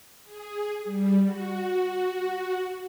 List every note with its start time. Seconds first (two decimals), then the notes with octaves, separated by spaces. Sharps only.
0.24 G#4
0.84 G3
1.23 F#4